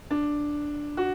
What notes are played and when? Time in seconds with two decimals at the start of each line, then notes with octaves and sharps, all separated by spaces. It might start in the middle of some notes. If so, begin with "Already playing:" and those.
0.11 D4
0.97 F#4